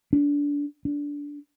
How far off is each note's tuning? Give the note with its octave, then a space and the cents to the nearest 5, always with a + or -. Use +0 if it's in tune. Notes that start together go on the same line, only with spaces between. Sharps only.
D4 -25
D4 -15